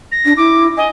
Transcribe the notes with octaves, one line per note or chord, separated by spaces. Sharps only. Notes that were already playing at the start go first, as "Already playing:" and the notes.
A#6
D4
E4 D6
D#5 G#5